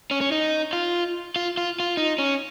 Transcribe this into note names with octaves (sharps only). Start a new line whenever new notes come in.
C#4
C#4
D#4
F4
F4
F4
F4
D#4
C#4